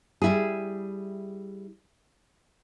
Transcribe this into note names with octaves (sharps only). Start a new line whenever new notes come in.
G3 E4 G#4